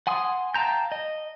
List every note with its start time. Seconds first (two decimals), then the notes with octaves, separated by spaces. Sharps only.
0.07 F#5 G#5 C6 D#6
0.54 F5 G5 A5 A#5 G6
0.92 D#5